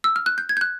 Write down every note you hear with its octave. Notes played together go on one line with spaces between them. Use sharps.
E6
F6
F#6
G6
G#6
G6
F#6